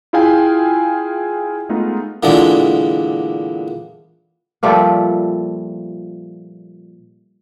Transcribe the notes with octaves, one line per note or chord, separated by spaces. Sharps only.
E4 F4 G#4 F5 G5 G#5
G#3 A3 B3 D#4 F4
A#2 D3 E3 G#3 B3 D4
A#2 F3 G3 A3